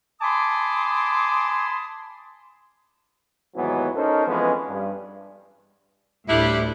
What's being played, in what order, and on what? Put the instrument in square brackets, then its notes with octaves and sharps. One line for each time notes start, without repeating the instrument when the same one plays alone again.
[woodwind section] G#5 A5 B5 C6 D6 D#6
[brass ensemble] D#2 G#2 E3 F#3 B3
C#4 D#4 A4 A#4 C5
F2 E3 G#3 B3 C#4
G2
[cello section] D2 A2 [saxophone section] G3 D4 E4